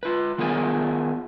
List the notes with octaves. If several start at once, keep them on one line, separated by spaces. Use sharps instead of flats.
F4 B4
D#3 B3 F4 G#4 A#4